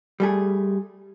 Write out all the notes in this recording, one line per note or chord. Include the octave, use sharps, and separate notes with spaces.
G3 A3 G#4